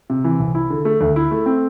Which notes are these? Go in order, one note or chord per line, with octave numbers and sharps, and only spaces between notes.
C3
E3
C2
E4
D3
A3
D2
E4
A3
C4